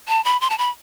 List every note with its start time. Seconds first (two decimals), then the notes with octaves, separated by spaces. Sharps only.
0.08 A5
0.25 B5
0.41 C6
0.50 A5
0.58 B5